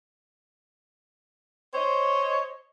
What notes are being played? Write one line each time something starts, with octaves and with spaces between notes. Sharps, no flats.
C5 C#5 D#5